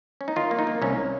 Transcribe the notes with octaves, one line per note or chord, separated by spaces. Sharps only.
C#4
D#4
D#3 F4
A#3
D#4
A#3
C2 C#4